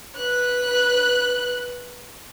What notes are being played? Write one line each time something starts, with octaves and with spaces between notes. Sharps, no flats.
B4 F#6